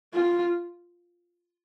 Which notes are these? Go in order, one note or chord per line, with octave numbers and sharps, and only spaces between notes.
F4